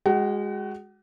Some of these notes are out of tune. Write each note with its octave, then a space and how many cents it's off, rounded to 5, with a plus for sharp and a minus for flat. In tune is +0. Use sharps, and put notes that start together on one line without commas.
G#3 -15 F#4 +0 F#5 +40